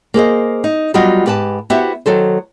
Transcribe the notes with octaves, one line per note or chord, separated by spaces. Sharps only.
A#3 G#4 C5 D#5
D#4
F#3 G3 B3 F4 F#4 D#5
G#2 G4 B4 G#5 A5
B3 E4 F#4 G4 C5 E5
D#3 F#3 A4 C5